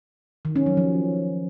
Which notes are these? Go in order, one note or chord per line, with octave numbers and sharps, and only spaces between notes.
D#3
C#4
F#3
F3